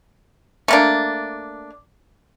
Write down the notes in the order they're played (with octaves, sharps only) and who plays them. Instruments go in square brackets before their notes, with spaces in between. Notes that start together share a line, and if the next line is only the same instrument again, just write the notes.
[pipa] A3 A#3 D4